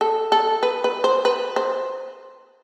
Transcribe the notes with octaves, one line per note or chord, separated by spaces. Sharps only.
A4
A4
B4
B4
C5
B4
C5